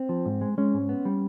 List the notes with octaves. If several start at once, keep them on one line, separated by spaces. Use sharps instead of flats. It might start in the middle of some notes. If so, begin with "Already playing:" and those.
Already playing: C4
F3
G#2
G#3
G#3 C#4
G#2
B3
G3